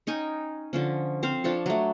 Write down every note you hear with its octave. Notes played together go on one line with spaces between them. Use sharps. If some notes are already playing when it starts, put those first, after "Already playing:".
C#4 D#4 G5 G#5
D3 F3 C#4
C4 C5 F5
F3 D4 A4 C#5
F#3 A3